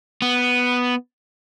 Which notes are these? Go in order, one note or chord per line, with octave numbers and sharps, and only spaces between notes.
B3